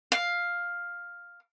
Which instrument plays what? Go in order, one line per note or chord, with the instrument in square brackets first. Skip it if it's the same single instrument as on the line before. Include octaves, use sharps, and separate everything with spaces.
[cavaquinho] F5